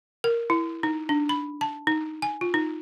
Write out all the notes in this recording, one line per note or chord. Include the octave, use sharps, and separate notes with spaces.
A#4
E4
D#4
D4
B5
A5
D#4
G#5
F4
D#4